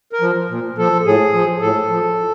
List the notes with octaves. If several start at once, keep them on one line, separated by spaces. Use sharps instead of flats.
A#4
F3
A#2
F3 A4
A2 G#4
F3
A2 A4
F3